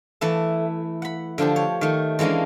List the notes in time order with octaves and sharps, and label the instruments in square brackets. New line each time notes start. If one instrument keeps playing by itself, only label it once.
[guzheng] E3 A3 E4 A5
F#5 B5
D3 F3 D4 G4
C#5
D#3 A3
E3 G#3 A#3 C#4 D4